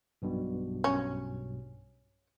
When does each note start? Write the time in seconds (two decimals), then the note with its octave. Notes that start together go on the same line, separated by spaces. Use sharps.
0.22 B1 G2 B2
0.84 C#4